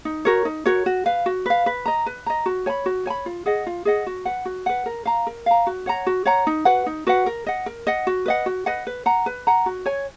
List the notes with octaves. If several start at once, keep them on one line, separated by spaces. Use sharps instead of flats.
D#4
F#4 A#4 C#5
D#4
F#4 A#4 C#5
F#4
B4 F5
F#4
B4 F5
B4
D#5 A#5
B4
D#5 A#5
F#4
C#5 G#5 B5
F#4
C#5 G#5 B5
F4
G#4 D#5 F#5
F4
G#4 D#5 F#5
F#4
B4 F#5
F#4
B4 F#5
A#4
F5 A#5
A#4
F5 A#5
F#4
C#5 F#5 A#5
F#4
C#5 F#5 A#5
D#4
F#4 B4 F#5
D#4
F#4 B4 F#5
A#4
D#5 F#5
A#4
D#5 F#5
F#4
B4 D#5 F#5
F#4
B4 D#5 F#5
B4
F#5 A#5
B4
F#5 A#5
F#4
C#5 G#5